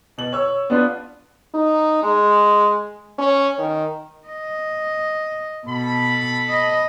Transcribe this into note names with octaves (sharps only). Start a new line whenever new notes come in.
B2 F#7
C#5 E6
B3 D4 F4 B4
D#4
G#3
C#4
D#3
D#5
B2 A4 A5 B5
D#5